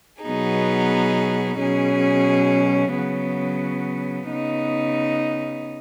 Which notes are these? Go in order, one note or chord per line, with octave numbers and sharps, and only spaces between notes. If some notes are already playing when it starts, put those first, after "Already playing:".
B2 F#3 B3 D#4 G#4
B2 F#3 C#4 G#4
C#3 F#3 B3
C#3 B3 D#4